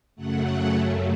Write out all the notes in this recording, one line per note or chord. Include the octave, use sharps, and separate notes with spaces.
F#2 C#3 F#3 A3 F#5